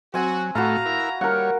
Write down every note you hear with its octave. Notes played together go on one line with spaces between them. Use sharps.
F#3 C4 F#4 G#5
A2 A3 F#4 B4 F5 A#5
E4 A#4
G3 A#4 C#5 F#5